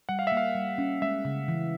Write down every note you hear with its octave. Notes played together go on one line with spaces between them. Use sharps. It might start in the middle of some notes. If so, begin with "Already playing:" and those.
G3 F#5
F5
E5
A#3
F5
G3
C#4
G#3 E5
C#3
E3